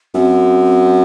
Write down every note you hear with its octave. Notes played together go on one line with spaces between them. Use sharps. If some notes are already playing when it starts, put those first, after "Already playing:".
F#2 C4